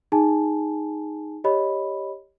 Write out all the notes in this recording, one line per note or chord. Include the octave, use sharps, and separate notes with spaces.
D#4 G#4 G#5 A5
G4 C#5 D#5 B5